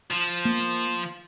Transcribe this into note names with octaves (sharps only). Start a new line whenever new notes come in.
F3
A#3